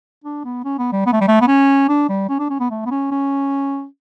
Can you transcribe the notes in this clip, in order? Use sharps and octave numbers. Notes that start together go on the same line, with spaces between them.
D4
B3
C#4
B3
G3
B3
A3
G3
A3
B3
C#4
D4
G3
C#4
D4
C#4
B3
A3
B3
C#4
C#4